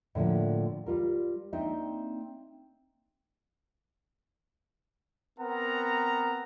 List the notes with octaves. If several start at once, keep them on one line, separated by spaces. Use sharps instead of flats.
A2 D3 F3 A#3
G3 F4 A#4
A#3 C4 D4 D#4 E5
B3 C4 A#4 F#5 A#5